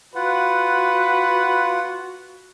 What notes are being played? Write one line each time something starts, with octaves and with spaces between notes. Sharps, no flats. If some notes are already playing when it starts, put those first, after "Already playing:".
F4 F#4 B4 F#5